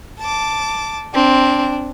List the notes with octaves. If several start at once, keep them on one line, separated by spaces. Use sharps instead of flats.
A5 D6
C4 D4